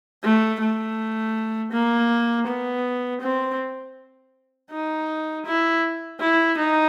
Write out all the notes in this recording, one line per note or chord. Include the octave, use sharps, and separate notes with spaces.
A3
A3
A#3
B3
C4
D#4
E4
E4
D#4